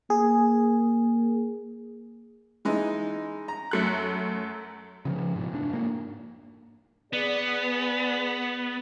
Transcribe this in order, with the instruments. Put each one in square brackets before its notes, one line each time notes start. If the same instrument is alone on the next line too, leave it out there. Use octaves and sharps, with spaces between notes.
[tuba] A#3 [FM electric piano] G#4
[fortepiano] E3 G#3 D#4
A#5
[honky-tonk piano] F#2 A3 F#6
[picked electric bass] C#3 E3 F3
G#2 B2
F1 D4
G#2 A#3
[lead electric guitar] B3 [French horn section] G#4 D5